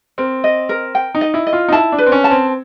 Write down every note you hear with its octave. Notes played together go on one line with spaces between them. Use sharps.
C4 A#4
D#5
A#4
G5
D#4
D#5
E4
D#5
F4
D#4
E4 A5
D4
B4
C4
C#4
A5
C4